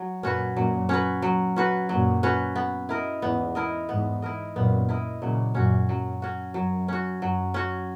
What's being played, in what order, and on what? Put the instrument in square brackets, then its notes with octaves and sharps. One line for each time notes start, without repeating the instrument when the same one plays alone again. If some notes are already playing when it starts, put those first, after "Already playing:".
Already playing: [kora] F#3
[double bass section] F#2 A#2 [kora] C#4 F#4 B4
[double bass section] F#2 A#2 [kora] F#3
[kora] C#4 F#4 B4
F#3
C#4 F#4 B4
[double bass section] F#2 A#2 [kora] F#3
[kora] C#4 F#4 B4
B3
E4 A#4 D#5
[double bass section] E2 G#2 [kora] B3
[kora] E4 A#4 D#5
[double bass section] E2 G#2 [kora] B3
[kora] E4 A#4 D#5
[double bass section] F#2 A#2 [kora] B3
[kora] E4 A#4 D#5
[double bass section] A#2 C#3 [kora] F#3
[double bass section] F#2 A#2 [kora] C#4 F#4
[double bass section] F#2 [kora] F#3
[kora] C#4 F#4
[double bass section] F#2 [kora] F#3
[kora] C#4 F#4
[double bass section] F#2 [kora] F#3
[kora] C#4 F#4